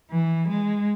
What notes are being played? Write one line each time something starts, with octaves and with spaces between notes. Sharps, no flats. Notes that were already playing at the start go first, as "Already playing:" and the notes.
E3
G#3